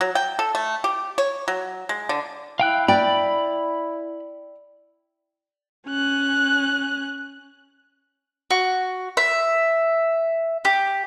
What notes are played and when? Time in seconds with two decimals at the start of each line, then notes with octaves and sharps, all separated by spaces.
0.01 F#3
0.15 G5
0.39 A4
0.55 A3
0.84 G4
1.18 C#5
1.48 F#3
1.89 G#3
2.09 D3
2.60 E4 F5 G5 F#6
2.88 D5 G5 B5
5.88 C#4 F#6
8.51 F#4
9.17 E5
10.65 G4